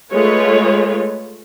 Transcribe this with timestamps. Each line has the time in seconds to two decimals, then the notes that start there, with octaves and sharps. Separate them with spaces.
0.12 G#3 A3 F4 B4 C#5